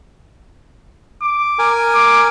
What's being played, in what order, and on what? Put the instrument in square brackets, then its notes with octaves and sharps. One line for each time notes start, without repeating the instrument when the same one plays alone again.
[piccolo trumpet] D6
[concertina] A#4 G#5
[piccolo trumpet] D6